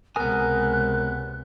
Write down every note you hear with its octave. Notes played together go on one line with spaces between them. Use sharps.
C#2 C3 B3 A#4 G#5 D#6 F#6